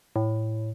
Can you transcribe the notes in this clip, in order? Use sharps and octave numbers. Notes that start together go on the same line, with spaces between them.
A2